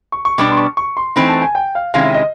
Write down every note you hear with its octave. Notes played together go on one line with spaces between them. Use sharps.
C#6
C#6
B2 G3 B3 D4 D6
C6
C#6
C#6
C6
E3 A3 C4 D#4 B5
A5
G#5
G5
F5
C3 D#3 G#3 C#4 E4 F5
E5
D#5